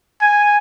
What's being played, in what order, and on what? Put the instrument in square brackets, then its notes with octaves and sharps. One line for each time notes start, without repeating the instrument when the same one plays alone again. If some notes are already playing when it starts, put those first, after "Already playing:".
[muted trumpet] G#5